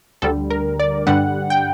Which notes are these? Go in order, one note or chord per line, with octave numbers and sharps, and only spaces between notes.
D2 D3 G3 A4
A#4
D5
G2 D3 G3 F#5
G5